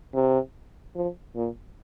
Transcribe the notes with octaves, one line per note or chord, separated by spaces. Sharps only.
C3
F3
A#2